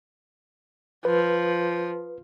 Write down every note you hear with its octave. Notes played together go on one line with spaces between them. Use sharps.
F3 B4